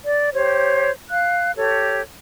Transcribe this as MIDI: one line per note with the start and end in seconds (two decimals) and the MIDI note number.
0.05 0.29 74
0.33 0.91 67
0.33 0.91 72
0.33 0.91 73
1.10 1.51 77
1.10 1.51 90
1.57 2.01 67
1.57 2.01 69
1.57 2.01 73